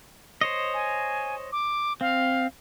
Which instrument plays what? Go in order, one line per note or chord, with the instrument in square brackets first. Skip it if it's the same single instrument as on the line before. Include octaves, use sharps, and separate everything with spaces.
[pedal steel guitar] C5 C#5 D#5
[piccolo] G#5
D6
[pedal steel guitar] C4 [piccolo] F5